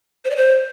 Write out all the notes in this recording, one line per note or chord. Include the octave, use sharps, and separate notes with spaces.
C5
D5
C5